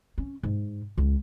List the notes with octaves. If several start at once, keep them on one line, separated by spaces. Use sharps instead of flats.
C#4
G#2
C#2